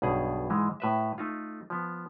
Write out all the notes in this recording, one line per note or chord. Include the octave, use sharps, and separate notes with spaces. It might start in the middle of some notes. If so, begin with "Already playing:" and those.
B1 G2 B2 G#4
G#2 E3 G#3
A2 B4 E5
A3 D#4 F4
F3 B3